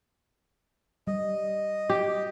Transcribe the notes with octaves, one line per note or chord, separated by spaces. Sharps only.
G3 D#5
G4